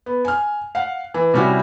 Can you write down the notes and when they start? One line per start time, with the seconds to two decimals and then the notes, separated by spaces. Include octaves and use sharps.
0.06 B3
0.25 G#5 F6
0.75 F5 F#5
1.14 E3
1.34 C3 G3 C#4 E4 F#4